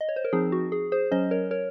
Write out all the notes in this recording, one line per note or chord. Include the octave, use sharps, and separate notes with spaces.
D#5
C#5
C5
A#4
F3 C4 D#4 G#4
F#4
G#4
G#4 C5
F#3 C#4 C5 D#5
A#4 C#5
A#4 C#5